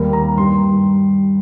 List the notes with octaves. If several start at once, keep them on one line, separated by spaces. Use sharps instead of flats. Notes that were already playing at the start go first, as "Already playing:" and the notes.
Already playing: D#2 D#3 G3 A#4
A#5
G2 G3 C6